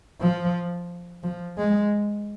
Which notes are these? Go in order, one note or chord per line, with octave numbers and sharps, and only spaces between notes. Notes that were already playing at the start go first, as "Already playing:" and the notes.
F3
F3
G#3